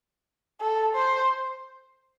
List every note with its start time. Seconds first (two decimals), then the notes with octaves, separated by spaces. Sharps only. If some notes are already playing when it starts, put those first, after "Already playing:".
0.61 A4
0.95 C5